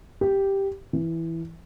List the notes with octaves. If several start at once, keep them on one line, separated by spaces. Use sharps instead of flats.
G4
E3